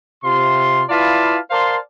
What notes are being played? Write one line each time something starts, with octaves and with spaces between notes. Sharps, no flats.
C3 F4 C6
E4 F4 B4 D5 F5 A5
A#4 C5 D5 F5 A5 C6